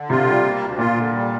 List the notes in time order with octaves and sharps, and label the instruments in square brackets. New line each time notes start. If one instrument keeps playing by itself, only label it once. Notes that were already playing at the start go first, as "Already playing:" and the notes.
Already playing: [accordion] D3
[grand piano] C3 [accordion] F4
[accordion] G3
A#3
D2
[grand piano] A#2 [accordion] F4
[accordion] D3
G3